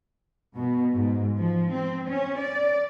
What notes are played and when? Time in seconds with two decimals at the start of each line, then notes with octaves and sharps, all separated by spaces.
0.55 B2
0.94 G#2
1.38 F3
1.72 C4
2.08 C#4
2.40 D5